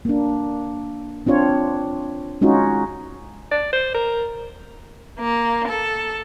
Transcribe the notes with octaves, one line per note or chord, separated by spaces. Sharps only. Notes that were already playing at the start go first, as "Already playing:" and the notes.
A#3 D4
C4 D4 F4 C#5
G#3 C#4 D#4 F4 F#4
D5
C5
A#4
A#3
A4